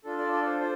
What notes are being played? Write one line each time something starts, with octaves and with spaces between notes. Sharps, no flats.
D4 F4 A4
D5
D5
C5
F4 C5